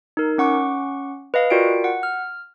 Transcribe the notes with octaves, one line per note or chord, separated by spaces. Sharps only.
D#4 A#4
C#4 F#5 C#6 D6
B4 D#5 F5
F4 F#4 A#4 D5 G5 D7
F#5
F6